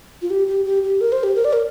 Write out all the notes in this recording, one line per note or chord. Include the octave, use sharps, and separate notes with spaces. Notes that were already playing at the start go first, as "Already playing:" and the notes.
F4
G4
G4
G4
G4
A#4
C5
G4
A#4
D5
A#4